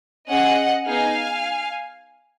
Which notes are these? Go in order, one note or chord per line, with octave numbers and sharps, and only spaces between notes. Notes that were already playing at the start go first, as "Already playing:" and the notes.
C#4 G#4 D#5 F#5
B3 D#4 G#4 F5 G#5